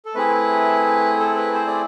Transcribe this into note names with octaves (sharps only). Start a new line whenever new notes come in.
A4
A3 C4 E4 G#4 B4
A4
B4
C5
D5